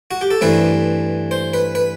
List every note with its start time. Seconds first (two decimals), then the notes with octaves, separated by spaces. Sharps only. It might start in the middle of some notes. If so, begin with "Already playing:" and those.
0.11 F#4
0.21 G4
0.31 A4
0.41 G2 E3 A3 C4 B4
1.31 C5
1.54 B4
1.75 B4